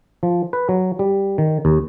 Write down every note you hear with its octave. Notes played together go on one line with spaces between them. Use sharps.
F3
B4
F#3
G3
D#3
D#2